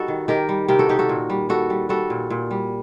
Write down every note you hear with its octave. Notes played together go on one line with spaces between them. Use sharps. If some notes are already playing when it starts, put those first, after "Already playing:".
Already playing: G3 D#4 F#4 A4
D#3
D#3 G4 A#4
G3
C3 G4 A#4
F#4 A4
D#3 D#4 G4
F#4 A4
A#2
G3
G3 F#4 A4
G3
G3 F#4 A4
A#2
A#2
G3